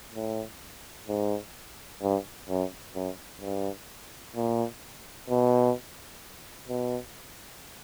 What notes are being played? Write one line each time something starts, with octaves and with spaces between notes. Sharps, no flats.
A2
G#2
G2
F#2
F#2
G2
A#2
B2
B2